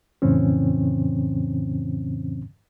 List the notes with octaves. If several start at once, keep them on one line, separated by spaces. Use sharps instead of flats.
F2 A2 C#3 E3 C4 C#4